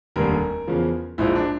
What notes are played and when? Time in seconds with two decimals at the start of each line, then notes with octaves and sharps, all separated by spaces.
0.16 F1 D#2 D3 G3 A#4
0.67 E2 C#3 F3
1.18 A#1 G#2 F3 E4
1.35 D4